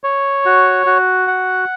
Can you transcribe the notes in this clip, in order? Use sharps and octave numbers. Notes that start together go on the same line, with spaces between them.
C#5
F#4
F#4
F#5